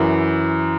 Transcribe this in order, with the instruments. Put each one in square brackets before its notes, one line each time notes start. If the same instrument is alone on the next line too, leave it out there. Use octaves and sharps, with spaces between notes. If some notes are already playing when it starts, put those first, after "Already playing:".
Already playing: [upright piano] F#2 E3